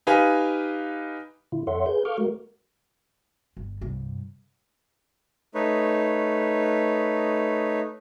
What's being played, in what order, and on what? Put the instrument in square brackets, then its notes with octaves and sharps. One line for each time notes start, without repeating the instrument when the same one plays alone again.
[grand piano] D#4 G4 B4 F5 G#5
[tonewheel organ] A#2 D3 E4 F4
F2 A4 C#5 E5 F#5 C6
G#4 B4 G6
A4 F5 C#6 D6 F6 G6
G#3 A3 F#4 A#4
[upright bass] G1
C2 G2
[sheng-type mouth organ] A3 D#4 B4 C#5